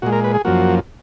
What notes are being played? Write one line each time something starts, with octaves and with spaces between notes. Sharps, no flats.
A#2 G#3 F#4
A#4
B4
G#4
F#2 F3 A#3 F#4